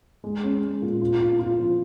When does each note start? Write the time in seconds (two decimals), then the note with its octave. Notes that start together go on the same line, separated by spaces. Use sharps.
0.24 G#3
0.43 C#4
0.62 G#3
0.82 A#2
1.01 F4
1.20 F4
1.39 F4
1.58 F3